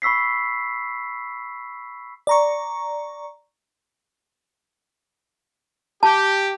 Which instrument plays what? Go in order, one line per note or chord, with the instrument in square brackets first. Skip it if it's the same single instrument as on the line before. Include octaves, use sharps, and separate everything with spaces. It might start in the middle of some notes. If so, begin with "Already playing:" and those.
[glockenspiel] B5 C#6 E6 B6 C7
[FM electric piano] D5 A#5 C#6
[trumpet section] G4 [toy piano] A5